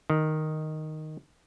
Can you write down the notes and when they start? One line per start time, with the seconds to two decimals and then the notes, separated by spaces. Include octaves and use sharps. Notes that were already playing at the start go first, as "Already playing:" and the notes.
0.10 D#3